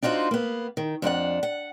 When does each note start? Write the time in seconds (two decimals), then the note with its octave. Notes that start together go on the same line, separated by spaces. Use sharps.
0.03 D4 D#4 F4 F#4 C5
0.31 A#3 B3
0.77 D#3
1.02 F2 D4 E4 F#5
1.43 F#5